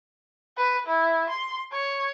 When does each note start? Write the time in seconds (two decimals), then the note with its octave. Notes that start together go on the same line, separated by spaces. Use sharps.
0.57 B4
0.86 E4
1.30 C6
1.72 C#5